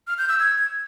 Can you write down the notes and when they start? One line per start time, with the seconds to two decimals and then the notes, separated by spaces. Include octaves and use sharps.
0.07 F6
0.18 G6
0.29 E6
0.39 G#6